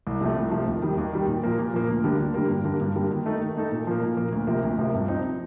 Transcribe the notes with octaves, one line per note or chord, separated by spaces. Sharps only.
C2
C3 F3 A3
C2
C3 F3 A3
D#2
D#3 G3
D#2
D#3 G3
A#2
F3 A#3
A#2
F3 A#3
D2
D3 G3 A#3
D2
D3 G3 A#3
G2
D3 G3 A#3
G2
D3 G3 A#3
D#3
A3 D#4 A4
D#3
A3 D#4 A4
A#2
F3 A#3
A#2
F3 A#3
D2
C3 F3 A#3
D2
C3 F3 A#3
G2
F3 C4 D#4